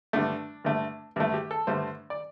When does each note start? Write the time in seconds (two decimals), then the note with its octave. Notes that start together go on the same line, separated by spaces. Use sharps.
0.13 G2 D3 A3 D4
0.65 G2 D3 A3
1.16 G2 D3 A3 E4
1.34 G4
1.51 A4
1.67 G2 D3 A3 C5
2.10 D5